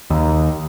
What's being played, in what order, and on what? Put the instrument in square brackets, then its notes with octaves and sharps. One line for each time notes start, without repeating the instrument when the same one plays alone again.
[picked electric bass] D#2